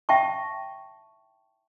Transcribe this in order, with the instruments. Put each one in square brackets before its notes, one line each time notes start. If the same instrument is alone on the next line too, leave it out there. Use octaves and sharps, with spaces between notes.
[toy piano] E5 G5 A5 C#6